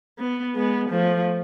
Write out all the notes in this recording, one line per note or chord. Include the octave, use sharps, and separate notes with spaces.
B3
G#3 B3
F3 A3